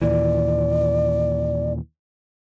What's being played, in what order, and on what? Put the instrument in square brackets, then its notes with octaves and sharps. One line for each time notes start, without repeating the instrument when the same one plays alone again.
[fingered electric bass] D#2 A#2 E3 [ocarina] D5